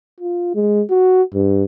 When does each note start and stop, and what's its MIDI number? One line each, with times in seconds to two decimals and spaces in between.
0.20 0.55 65
0.55 0.82 56
0.90 1.23 66
1.34 1.64 43